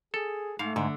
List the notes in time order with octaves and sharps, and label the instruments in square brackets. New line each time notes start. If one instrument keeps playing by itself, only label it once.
[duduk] G#4 [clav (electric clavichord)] A4
[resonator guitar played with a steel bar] G#2 [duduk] A3 [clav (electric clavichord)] F5
[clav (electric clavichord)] G#2 [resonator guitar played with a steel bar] D3